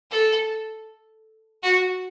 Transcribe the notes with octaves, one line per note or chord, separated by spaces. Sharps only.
A4
F#4